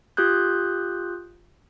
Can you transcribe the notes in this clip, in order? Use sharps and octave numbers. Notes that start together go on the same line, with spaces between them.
F4 G4 D#6 F#6 G6